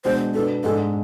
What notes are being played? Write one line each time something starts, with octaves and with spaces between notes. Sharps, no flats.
B2 G#3 D4 C5
B2 B3 D4 A4
G#2 G#3 D4 A4